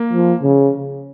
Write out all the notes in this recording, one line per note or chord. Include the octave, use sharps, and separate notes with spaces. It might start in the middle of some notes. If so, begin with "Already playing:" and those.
Already playing: A#3
F3
C#3